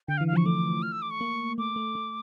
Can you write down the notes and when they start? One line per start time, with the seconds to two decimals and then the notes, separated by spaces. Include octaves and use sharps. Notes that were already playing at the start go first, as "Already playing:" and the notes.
0.08 D3 G5
0.18 F5
0.21 E3
0.28 F5
0.33 F3 C#6
0.45 A3 D6
0.83 F6
0.92 E6
1.02 D6
1.11 C#6
1.21 A#3
1.58 A3 D6
1.76 A3
1.95 A3